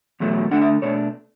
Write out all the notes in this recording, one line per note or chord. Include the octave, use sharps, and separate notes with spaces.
E2 B2 F#3 A3
D3 A3 D4 F#5
E5
B2 A3 D4 C#5